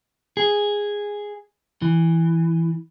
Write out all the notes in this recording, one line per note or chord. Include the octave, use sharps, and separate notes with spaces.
G#4
E3